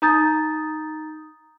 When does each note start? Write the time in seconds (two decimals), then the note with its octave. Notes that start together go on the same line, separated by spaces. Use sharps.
0.02 D#4 A#5 D#6 G6 A6